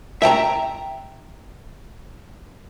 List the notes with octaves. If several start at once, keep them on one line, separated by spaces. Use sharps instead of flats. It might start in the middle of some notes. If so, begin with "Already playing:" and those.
E5 G5 A5 A#5